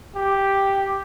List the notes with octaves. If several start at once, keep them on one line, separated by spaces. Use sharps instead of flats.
G4